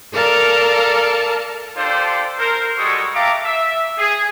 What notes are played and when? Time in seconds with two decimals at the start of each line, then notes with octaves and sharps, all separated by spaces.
0.12 A4 A#4 D5 F5 A5 A#5
1.76 D4 F4 G4 A4 C5
2.39 A#4 C5
2.78 G3 G#3 F#4 A4 C#6 D#6
3.15 E5 F5 G5 A5 A#5 D6
3.44 E5
3.98 G#4